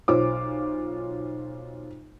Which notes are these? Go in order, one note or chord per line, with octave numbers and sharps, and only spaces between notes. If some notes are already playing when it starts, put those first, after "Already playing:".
B1 F4 C5 C#5 D6